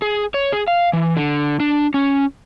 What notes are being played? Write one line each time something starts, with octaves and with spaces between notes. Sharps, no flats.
G#4
C#5
G#4
F5
E3
D3
D4
C#4